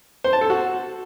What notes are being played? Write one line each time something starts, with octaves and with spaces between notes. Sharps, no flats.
C5
A5
A4
F#4